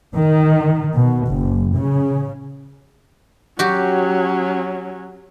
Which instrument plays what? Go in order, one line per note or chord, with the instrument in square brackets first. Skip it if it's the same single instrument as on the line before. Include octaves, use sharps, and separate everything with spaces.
[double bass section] D#3
B2
F#1
C#3
[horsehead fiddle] F#3 C#4 [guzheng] F#4 G4